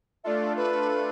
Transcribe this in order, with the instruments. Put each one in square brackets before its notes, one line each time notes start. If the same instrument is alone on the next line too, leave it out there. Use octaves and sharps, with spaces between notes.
[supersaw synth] A3 D4 F4 A4 [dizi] D5 E5
[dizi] B4